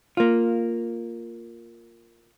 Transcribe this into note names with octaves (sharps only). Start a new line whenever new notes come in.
A#3 F4